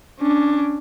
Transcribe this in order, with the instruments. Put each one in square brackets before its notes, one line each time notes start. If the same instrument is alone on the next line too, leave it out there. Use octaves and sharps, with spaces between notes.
[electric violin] C#4 D4